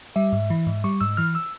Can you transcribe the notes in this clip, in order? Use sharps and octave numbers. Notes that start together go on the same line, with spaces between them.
G3 E5
G#2
E3
G#2
G3 C#6
G#2 E6
E3 F6
E6